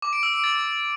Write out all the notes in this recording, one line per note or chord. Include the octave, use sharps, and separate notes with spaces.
D6
D7
E6
D7
A6